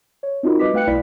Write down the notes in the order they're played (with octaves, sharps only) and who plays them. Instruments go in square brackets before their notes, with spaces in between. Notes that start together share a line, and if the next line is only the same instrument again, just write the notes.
[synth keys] C#5
C4 D#4 F4 F#4 A#4
G3 F#4 B4 D#5 D6 B6
A3 B4 F5 G5 F#6 C#7
B1 E4 D5 F5 B5 B6